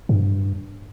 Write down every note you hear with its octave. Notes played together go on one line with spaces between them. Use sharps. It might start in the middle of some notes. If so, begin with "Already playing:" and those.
G2